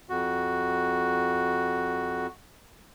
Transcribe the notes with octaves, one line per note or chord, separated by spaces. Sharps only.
F2 F#4